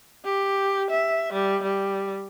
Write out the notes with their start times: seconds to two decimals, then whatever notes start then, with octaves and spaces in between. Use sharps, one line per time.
0.24 G4
0.91 E5
1.33 G3
1.62 G3